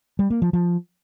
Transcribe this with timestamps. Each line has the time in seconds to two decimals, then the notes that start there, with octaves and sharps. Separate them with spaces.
0.19 G3
0.30 A#3
0.42 F3
0.53 F3